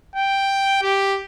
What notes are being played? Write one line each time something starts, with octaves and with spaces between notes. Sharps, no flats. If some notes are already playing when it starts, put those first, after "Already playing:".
G5
G4